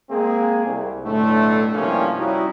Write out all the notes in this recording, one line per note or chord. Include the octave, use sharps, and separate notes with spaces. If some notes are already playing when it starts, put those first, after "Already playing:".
G#3 A#3 C4 G#4
C2
B1 A2 D3 A3
G2 C3 F3 A#3 C#4 E4
G3 C#4 D#4 E4 F#4